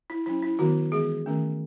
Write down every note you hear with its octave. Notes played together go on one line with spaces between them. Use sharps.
E4
F#3 C#4 E4
E4
D#3 F#3 B3 F#4
E3 G#3 B3 G#4
D#3 A3 C#4